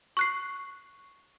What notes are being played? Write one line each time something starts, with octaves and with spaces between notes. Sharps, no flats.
C#6 F#6 C7